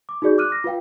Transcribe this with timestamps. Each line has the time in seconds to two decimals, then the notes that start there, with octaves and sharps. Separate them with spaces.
0.09 D6
0.22 D#4 F#4 G#4 D5 G6
0.38 D6 F6 F#6 D#7
0.50 D6 A#6
0.64 F4 B4 F5 G5